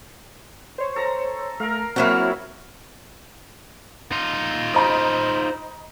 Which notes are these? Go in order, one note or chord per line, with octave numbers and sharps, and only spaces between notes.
C5 C#5
A4 A#5
A3 A#4 F5
F#3 A#3 C4 C#4 E4 F#4 B4 F5
D#4 F4
C5 D#5 A#5 B5